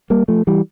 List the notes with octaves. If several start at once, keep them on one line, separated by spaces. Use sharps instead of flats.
G3 A#3
F3 A3
E3 G3